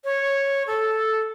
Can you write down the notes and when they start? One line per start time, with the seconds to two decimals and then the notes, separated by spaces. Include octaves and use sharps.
0.04 C#5
0.67 A4